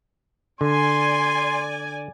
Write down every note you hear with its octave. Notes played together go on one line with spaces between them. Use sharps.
D3 D5 G#5 C6